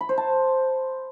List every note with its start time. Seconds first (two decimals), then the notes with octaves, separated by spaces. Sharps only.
0.01 B5
0.09 C5
0.18 A5